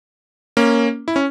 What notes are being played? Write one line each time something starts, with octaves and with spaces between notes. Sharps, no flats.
A#3 C#4
E4
C#4